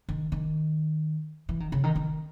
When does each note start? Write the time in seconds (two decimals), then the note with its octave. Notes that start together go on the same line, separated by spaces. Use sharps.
0.09 D#3
0.32 D#3
1.49 E3
1.60 D#3
1.72 C#3
1.84 D#3
1.95 D#3